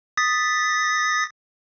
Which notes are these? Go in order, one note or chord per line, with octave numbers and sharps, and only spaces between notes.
D#6 A6 B6